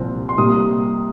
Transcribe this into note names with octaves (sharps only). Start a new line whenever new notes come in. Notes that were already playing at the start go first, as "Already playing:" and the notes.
Already playing: C2 A#2 F3 C4
C6
C3 G3 A#3 D#6